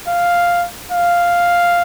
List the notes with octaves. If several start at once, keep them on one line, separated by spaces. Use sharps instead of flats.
F5
F5